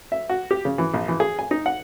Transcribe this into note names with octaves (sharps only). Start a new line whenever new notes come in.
E5
F#4
G4
C#3
E3
A#1
E3
G#4
G#5
D#4
F#5